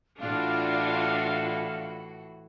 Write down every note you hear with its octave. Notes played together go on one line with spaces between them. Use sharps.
A2 E3 D4 F4 F#4 F5